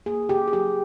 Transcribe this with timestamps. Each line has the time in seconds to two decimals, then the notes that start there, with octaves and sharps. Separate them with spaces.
0.06 A#3 G#4
0.29 C#3 G4
0.48 G#4
0.53 F#3 G4